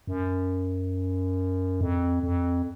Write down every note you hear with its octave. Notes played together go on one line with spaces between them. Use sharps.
F#2
F2
F2